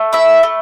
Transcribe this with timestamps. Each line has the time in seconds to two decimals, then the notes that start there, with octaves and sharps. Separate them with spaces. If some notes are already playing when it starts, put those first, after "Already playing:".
Already playing: A3
0.13 E4 E5
0.43 A3